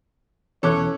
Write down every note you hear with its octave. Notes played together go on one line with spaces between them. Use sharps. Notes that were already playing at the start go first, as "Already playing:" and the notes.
E2 B2 E3 C#4 A4 C#5 D6 F#6